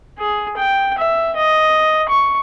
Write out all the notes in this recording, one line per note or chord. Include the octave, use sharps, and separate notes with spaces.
G#4
G5
E5
D#5
C#6